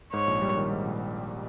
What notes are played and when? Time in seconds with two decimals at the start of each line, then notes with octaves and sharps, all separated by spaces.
0.13 G#2 C#5
0.27 A#1
0.42 G3
0.57 D#3
0.71 G#2
0.85 A#1